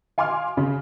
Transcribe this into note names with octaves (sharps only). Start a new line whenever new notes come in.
F5 G#5 C6 D6 F6
C#3